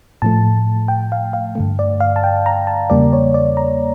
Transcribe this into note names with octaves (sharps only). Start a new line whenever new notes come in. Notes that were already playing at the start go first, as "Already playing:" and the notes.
A2 F3 A3 A5
G5
F5
F5
G2 D3 A3
D5
F5
A5
G5
A#5
A5
E2 C#3 G3 A#3 D5
C#5
D5
A#5